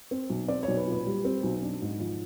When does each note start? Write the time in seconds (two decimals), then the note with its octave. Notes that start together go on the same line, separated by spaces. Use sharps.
0.11 C4
0.30 B1
0.48 C4 D5
0.63 B1 C#5
0.77 B4
0.87 A#2
0.92 B4
1.06 G3
1.25 C4
1.43 B1
1.63 D4
1.82 G#2
2.00 F3